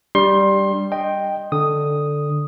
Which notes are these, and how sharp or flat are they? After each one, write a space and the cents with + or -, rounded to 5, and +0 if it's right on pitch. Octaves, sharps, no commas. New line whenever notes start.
G3 +0 D4 +0 C6 +20
D#5 -10 G5 +0
D3 +0 D#6 +0